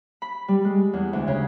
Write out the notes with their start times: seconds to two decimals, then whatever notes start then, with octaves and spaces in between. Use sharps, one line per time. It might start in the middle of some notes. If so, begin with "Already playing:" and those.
0.22 B5
0.48 G3
0.65 G#3
0.93 E2
1.13 D2
1.27 C#3